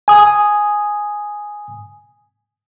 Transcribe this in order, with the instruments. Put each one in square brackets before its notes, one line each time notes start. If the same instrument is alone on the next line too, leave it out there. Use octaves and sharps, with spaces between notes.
[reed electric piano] G#5 D#6